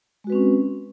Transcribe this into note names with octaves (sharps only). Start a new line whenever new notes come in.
G#3 C4 C#4 F#4 B4